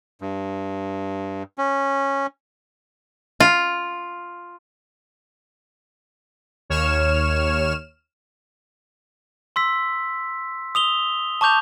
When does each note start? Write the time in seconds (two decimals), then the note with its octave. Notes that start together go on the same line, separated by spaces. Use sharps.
0.21 G2
1.58 C#4
3.40 F4
6.70 D#2 C#5 F6 E7
9.56 C6 E6 B6
10.75 D#6 F7 G7
11.41 A5 C#6 D6 G6 F7